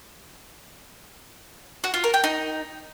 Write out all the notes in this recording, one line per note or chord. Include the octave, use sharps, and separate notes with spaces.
F#4
F4
A#4
G5
D#4